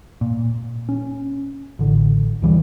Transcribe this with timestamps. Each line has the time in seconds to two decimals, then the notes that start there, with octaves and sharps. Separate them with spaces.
0.21 A#2
0.89 C#4
1.79 A1 D3
2.42 D2 E3 G3